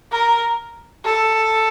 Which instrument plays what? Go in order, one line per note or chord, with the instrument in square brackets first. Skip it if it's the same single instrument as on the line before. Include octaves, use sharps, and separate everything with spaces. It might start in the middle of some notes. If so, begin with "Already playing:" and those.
[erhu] A#4
A4